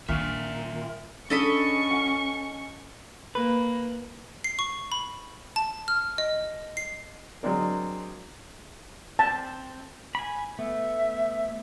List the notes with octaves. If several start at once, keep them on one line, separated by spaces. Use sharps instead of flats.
A#2 D#3 D4 A#4 E5
C#3 C#4 D4 A4 D#5 B5 C#6
F#5
A#3 B4
C7
C#6
B5
A5
F6
D#5
C7
F#3 G#3 C4 D4 A#4
C4 A5
G#5 B5
A3 B3 E5